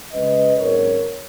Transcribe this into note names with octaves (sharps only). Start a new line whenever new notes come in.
C#2 C#3 G#3 C#4 B4 D#5
G#1 G#2 F#3 A#3 C#4 A#4 C#5